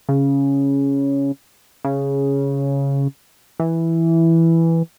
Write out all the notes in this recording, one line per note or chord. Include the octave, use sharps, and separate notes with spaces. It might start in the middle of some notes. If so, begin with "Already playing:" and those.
C#3
C#3
E3